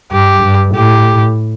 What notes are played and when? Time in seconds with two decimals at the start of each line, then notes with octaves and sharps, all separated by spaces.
0.12 G2 G4
0.43 G2
0.75 A2 G4